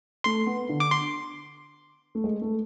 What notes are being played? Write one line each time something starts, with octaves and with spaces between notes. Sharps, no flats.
A3 C6
B3
D3
D6
C6
A3
G#3
A3